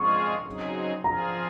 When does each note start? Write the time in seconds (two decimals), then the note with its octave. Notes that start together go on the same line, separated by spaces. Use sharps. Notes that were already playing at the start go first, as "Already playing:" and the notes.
Already playing: F3 G#3 C4 F4 G#4 C#6
0.46 C#3 F#3 C4 D#4 G#4
1.04 F3 C4 F4 G#4 A#5